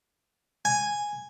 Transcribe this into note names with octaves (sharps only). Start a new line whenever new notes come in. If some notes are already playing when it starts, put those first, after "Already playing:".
G#5